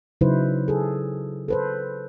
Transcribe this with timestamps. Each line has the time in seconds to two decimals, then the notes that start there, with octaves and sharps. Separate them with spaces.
0.21 C#3 F#3 D#4 E4 B4 C5
0.68 G#4 A4
1.48 A4 B4 C5